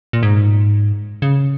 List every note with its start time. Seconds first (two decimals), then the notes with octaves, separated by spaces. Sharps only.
0.13 A#2
0.23 G#2
1.22 C#3